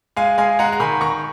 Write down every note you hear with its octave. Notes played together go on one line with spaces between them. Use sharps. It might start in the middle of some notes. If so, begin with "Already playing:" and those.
G#3 F5 G#5
G#3 F5 G#5
G#3 F#5 A#5
A#5
D#3 G#5 B5
D#3 A#5 C#6